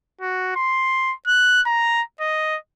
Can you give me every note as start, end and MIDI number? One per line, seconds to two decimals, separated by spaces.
0.21 0.53 66
0.56 1.14 84
1.27 1.61 90
1.67 2.02 82
2.21 2.57 75